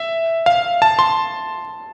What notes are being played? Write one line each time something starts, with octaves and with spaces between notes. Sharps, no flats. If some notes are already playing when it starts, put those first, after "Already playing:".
Already playing: E5
F5
A5
C6